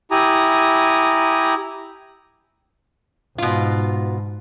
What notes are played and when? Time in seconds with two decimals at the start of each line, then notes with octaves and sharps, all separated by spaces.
0.11 E4 G4 G#5 A#5 D#6
3.38 G#2 B2 F4